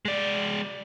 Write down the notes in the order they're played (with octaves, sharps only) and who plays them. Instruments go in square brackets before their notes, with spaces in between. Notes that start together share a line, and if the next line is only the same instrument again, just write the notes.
[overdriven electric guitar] G#3 D5